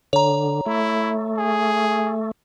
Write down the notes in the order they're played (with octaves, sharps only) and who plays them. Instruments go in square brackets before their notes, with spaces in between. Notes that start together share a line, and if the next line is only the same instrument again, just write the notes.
[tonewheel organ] D3 [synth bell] C#5 A#5
[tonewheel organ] A3 [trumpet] E4
[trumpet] G#4